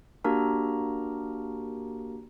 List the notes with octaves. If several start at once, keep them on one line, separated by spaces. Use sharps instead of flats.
A#3 D4 F#4 G4 A#4 A#5